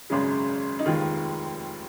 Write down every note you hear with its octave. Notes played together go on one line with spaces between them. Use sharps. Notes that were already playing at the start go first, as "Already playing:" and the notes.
G#1 F#2 C#3 G#3
D#4
F1 D#2 D#3 G#3 F4